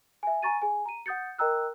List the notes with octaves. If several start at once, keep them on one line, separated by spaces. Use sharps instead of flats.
E5 G#5
G#5 A#5 C#6 A6 D#7
G#4 G#5
A#5 D#7
F#5 D#6 G6 A6 C#7
A#4 D#5 G5 A#5 E6 F#6